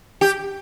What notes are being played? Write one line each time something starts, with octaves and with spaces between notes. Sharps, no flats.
G4